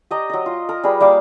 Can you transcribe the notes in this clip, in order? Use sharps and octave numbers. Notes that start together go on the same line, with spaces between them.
G4 D#5 A#5
F#3 D#5
F4
A#4
G3 G#4 A#4 B4
G3 A#3 F5 D6